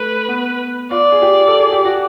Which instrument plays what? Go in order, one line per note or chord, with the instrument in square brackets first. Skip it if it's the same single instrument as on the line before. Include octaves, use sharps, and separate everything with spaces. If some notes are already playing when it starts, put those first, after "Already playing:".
Already playing: [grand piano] A3 [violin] B4
[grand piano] B3
[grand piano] F4 [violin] D5
[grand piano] G#4
G4
A4
G#4
G4
F#4